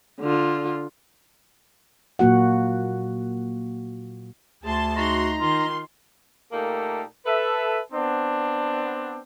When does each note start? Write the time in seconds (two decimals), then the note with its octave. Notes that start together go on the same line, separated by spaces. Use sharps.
0.21 D3 F4
2.19 A#2 F#3 A#3 F#4 F#5
4.64 D2 G#4 A5 C6
4.96 D#4 F#4 A#5 C6
5.40 D#3 F4 C6
6.52 A#2 A3 A#3 D#4 G4 A4
7.26 A4 B4 E5
7.93 B3 C4 D4